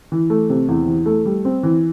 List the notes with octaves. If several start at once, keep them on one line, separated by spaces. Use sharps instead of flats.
E3
A3
C3
E2
E3
A3
G3
C4
E3